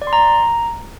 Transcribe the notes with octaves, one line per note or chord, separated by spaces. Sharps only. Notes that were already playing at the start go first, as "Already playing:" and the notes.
D5
C6
A#5